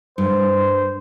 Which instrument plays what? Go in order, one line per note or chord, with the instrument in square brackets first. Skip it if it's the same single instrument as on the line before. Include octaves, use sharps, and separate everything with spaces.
[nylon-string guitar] G2 [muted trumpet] C5